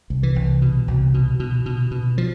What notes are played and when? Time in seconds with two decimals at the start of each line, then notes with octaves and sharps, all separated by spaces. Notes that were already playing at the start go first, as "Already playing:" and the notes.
0.10 C2
0.23 E3
0.36 C2
0.62 B2
0.88 C2
1.14 B2
1.40 B2
1.66 B2
1.91 B2
2.18 F3